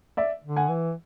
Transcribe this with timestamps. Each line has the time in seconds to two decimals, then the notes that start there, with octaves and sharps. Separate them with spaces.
0.17 D5 E5
0.44 D3
0.56 F#5 G#5
0.69 E3